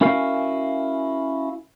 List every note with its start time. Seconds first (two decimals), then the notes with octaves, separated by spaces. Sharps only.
0.01 C#4 E4 F#4 A#4 F5 G#5